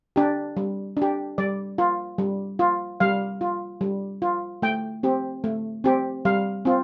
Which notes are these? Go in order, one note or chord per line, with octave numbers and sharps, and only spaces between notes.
D4 G4
G3
D4
G4
G3 D5
F4
G3
F4
G3 F5
F4
G3
F4
A3 G5
C4 G4
A3
C4 G4
G3 F5
C4 F4